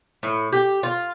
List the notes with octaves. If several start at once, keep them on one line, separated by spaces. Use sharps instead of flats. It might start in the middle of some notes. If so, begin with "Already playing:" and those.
A2
G4
F4